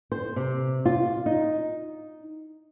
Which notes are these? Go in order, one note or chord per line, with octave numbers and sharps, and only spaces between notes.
C5
C3
F4
D#4